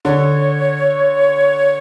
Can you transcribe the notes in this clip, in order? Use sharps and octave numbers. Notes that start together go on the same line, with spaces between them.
D3 C#5